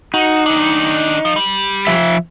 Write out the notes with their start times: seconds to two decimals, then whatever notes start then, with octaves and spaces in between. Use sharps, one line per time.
0.14 D#4 F#4
0.46 D#3 D4
1.25 F3
1.36 G3
1.87 F3 E5